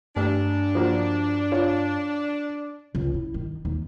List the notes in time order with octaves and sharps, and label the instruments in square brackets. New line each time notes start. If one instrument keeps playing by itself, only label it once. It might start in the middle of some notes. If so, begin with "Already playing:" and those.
[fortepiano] A1 [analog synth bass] G2 [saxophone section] D4
[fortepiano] F3 F#3 A#3
F4 C#5
[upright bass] C#2
E4
D#3
D#2